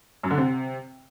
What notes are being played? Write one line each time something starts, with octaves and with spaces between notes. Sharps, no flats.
F#2
D3
C3